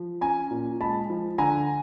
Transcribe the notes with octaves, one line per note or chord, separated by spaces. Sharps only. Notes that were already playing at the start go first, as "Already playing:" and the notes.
Already playing: F3
C#4 G#5 A#5
A#2
G#3 A5 B5
F3
D3 G#5 A#5